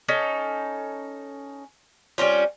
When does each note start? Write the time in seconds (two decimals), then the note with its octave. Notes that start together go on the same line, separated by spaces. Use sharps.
0.08 C#4 D#4 A4
2.18 G3 C4 C#4 F4